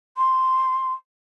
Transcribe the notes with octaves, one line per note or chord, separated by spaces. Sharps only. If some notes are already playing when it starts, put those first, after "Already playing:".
C6